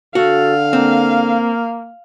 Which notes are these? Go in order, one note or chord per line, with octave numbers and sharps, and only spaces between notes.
D3 F#4 A4 F5
A#3 C4